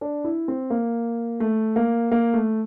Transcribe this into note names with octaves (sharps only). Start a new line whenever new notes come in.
D4
E4
C4
A#3
A3
A#3
A#3
A3